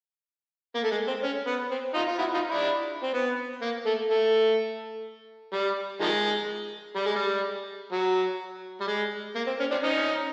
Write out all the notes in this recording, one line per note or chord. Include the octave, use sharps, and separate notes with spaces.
A#3
A3
G#3
C4
C#4
B3
C4
D#4 F4
F4
E4 F#4
D#4 F4
D4 E4
C4
B3
A#3
A3
A3
G3
D#3 F3 G#3
G3
G#3
G3
F#3
G3
G#3
A#3
C4
C#4
C4 D4
C#4 D#4